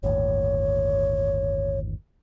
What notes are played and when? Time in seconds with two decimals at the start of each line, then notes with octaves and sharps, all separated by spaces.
0.03 G1 D#2 A2 C#5